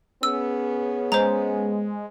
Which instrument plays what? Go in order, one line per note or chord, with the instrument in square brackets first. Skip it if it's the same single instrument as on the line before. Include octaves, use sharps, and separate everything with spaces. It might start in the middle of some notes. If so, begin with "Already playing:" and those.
[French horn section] B3 C#4 G#4 [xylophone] E6
[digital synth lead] G#3 [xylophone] C5 A#5